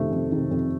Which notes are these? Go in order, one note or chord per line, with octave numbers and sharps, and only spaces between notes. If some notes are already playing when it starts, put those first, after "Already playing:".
Already playing: F2 C3 D#3 A3
F2
C3 D#3
F2